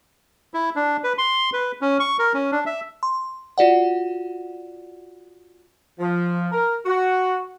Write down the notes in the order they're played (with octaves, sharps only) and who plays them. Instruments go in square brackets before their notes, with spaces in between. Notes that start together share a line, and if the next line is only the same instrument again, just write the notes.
[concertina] E4
D4
B4
C6
B4
C#4
C#6
A#4
C#4
D4
E5
[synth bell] C6
F4 F#4 D5 F#5
[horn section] F3
A#4
F#4